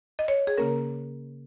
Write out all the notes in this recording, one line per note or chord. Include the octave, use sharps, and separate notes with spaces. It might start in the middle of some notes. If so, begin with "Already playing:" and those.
D#5
C#5
G#4
C#3 A#3 C#4 A#4